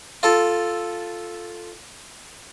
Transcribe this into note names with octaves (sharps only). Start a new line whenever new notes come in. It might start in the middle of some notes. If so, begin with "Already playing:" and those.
F4 A4